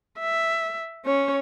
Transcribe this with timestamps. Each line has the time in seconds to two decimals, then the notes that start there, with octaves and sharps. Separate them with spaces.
0.20 E5
1.06 C#4 C#5